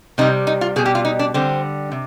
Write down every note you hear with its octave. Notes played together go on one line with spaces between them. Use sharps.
C3 G3 D#4
D#4
F4
B2 G3 G#4
G4
F4
D#4
D4
D3 G3 C4
C3